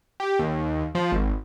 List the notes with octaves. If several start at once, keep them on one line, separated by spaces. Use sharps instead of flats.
G4
D#2
F3
G#1